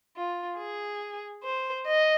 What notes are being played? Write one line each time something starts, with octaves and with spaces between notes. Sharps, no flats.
F4
G#4
C5
D#5